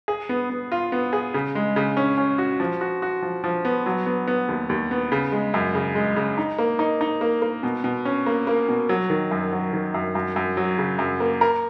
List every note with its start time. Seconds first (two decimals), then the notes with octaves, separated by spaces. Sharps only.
0.08 G#4
0.29 B3
0.50 B3
0.72 F4
0.92 B3
1.13 G#4
1.34 C#3
1.55 G#3
1.76 C#3
1.97 C#4
2.18 C#4
2.38 F#4
2.60 F3
2.81 F#4
3.02 F#4
3.22 F3
3.44 F3
3.65 B3
3.86 F#3
4.06 B3
4.27 B3
4.49 D#2
4.69 D#2
4.91 B3
5.12 C#3
5.32 G#3
5.54 F#2
5.75 C#3
5.95 G#3
6.16 C#3
6.37 D#4
6.58 A#3
6.79 D#4
7.01 D#4
7.21 A#3
7.42 A#3
7.63 B2
7.84 B2
8.05 C#4
8.26 A#3
8.47 A#3
8.69 B2
8.89 F#3
9.10 D#3
9.31 F#2
9.52 F#3
9.73 D#3
9.94 F#2
10.15 F#2
10.36 F#2
10.57 F#3
10.78 C#3
10.99 F#2
11.20 A#3
11.41 A#4